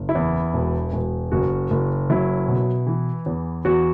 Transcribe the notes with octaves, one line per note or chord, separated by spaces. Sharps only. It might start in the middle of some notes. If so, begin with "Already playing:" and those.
Already playing: F#1
E4
E2
E1
E1
F#1 F#4
F#1
F#3 E4
B2
E3
E2
E2 F#4